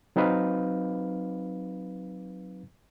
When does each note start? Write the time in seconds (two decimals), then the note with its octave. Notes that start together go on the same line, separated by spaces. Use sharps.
0.16 F#3 C4 D#4 B4 F5